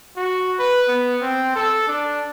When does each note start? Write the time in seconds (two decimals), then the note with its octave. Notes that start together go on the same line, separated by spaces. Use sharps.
0.17 F#4
0.59 B4
0.88 B3
1.21 C4
1.56 A4
1.88 D4